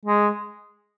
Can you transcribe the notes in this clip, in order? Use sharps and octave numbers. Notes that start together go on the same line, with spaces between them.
G#3